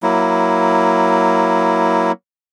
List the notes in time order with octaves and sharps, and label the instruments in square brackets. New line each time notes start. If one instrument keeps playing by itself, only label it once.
[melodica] F#3 A#3 E4